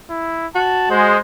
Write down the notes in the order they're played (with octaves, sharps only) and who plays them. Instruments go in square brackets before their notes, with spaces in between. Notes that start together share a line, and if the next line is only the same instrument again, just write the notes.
[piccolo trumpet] E4
[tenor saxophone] F#4 [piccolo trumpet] A5
[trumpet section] G#3 [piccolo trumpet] C5